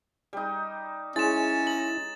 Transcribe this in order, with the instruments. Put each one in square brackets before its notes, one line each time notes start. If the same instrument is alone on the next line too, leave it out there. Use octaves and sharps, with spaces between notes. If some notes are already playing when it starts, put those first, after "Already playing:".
[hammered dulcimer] G3 D#4
[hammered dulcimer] G#3 C#5 [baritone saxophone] C#4 [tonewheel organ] E4 [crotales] A6 E7
[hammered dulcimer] A#5 [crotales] F#7